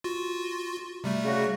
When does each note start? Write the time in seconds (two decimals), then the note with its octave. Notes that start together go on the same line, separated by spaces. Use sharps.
0.04 F4 F#4
1.04 C3 G3 A3
1.24 C#3 F#4